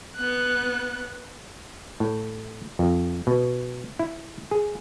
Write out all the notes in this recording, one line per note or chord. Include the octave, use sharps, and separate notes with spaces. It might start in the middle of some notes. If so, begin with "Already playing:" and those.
B3 F#6
A2
F2
B2
E4
G#4